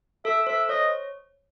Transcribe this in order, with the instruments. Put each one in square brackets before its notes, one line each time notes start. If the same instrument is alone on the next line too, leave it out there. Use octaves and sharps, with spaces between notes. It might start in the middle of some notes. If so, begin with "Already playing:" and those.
[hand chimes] A4 [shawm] E5
[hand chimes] C5 [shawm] E5
[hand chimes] C#5 [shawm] D#5